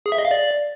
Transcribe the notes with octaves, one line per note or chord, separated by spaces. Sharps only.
G#4
E5
D#5
F5
D5